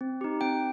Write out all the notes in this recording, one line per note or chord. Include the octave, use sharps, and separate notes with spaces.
C4
D#4 G4
C4 G5